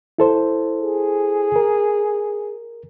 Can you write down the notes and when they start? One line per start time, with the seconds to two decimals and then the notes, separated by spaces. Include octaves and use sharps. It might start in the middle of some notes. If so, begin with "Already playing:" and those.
0.18 E4 A4 C5
0.81 G#4
1.56 A#4